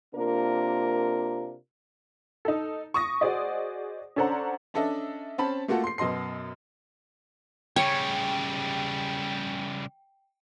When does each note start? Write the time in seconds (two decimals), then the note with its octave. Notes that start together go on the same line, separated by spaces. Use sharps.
0.15 C3 A#3 D4 F4 A#4
2.45 D#4 A4
2.94 C#6 D#6 A#6
3.21 F#4 G#4 C5 D5 D#5
4.16 C#4 D4 A4 C5 F#5 A#5
4.74 C#4 D4 A4 D#5 E5
5.38 C4 C#4 A5 B5
5.68 A3 A#3 F4 F#4 A4
5.84 C6 C7
5.98 F#2 B2 D#5 C6 C7
7.76 C#3 G3 C#5 G5